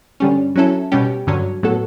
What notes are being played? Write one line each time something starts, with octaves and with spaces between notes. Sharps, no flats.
G2 D3 G3 C#4
F#3 C#4 E4 A4
B2 G3 C#4 G4
G2 D3 F#3 C#4
A2 F#3 B3 F#4 A4